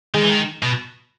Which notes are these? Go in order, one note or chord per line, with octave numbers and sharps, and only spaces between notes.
D#3 G#3
E3
D#3
B2